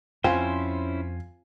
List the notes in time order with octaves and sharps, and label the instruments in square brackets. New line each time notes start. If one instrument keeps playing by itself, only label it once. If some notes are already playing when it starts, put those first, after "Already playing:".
[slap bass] F2 [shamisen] C4 [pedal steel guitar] C#4 E4 C5 [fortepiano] F4 G#5